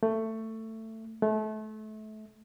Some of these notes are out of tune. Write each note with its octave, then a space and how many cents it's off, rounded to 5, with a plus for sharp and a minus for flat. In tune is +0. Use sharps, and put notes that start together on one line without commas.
A3 +15
A3 -30